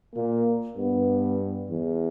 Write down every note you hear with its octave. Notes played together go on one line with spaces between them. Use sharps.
A#2 A#3
G2 B3
E2